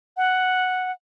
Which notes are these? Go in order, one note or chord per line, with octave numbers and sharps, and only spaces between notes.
F#5